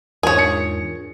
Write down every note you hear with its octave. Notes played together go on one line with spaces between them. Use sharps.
E2 G#2 D4 F4 G#4 A#4 C#5
C#7